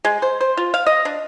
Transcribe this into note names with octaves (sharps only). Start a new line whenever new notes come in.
G#3
C5
C5
F4
F5
D#5
D4